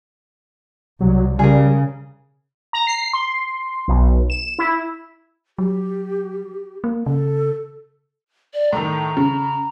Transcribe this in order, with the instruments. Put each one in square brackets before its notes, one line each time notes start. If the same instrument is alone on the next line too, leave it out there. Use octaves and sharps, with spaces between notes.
[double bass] C2 [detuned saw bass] F#3
[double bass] C#3 [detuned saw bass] G3 [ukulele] G#4 A#4
[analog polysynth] A#5
C7
C6
B1
E7
E4
[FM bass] F#3 [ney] G4
[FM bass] A#3
[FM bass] C#3 [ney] A4
[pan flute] D5
[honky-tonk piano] A2 D#3 [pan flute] A#5
[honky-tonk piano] C#3